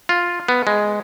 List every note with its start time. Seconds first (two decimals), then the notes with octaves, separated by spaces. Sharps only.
0.09 F4
0.48 B3
0.67 G#3